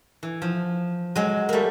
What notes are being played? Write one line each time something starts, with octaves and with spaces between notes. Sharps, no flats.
E3
F3
F#3 G#3
G3 A3 A#3